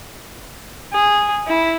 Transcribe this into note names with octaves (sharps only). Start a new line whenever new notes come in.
G#4
E4